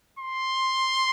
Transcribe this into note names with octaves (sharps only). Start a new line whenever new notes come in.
C6